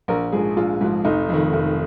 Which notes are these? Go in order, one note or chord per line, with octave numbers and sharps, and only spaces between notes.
A#1 A#4
G#2 F3 G#4
A#1 F4
G#2 F3
F1 D#4
F2 D#3
F1